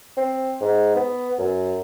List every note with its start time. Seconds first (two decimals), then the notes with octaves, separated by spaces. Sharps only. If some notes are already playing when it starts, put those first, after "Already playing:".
0.17 C4
0.61 G#2
0.96 B3
1.38 F#2